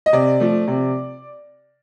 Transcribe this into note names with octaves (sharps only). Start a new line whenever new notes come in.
D#5
C3 D5
F3 A3
C3